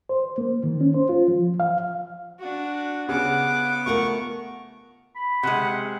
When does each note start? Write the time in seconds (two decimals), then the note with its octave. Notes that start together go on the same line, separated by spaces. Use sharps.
0.09 C5
0.38 A#3
0.63 D#3
0.81 C#4
0.94 C5
1.09 F4
1.28 F3
1.60 F5
2.39 D4 F#4
3.09 C#3 B3 F#5 D6
3.86 A3 F4 A#4 F#5 C#6
5.16 B5
5.43 C3 G#3 F#5